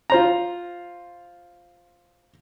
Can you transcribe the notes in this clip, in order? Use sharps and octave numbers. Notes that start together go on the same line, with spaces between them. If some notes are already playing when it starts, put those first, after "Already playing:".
F4 C5 A#5